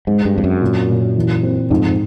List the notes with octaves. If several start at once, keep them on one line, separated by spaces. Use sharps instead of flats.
G#2 G#3
G2
F2 C4
F#2
A#2
A#2
E3
C4
F2 G#2